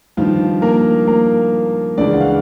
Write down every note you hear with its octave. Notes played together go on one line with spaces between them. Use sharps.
G2 D#3 F3 F4
A#3 A#4
A#3 A#4
C#2 C#3 E3 D4 D5
F#5
F5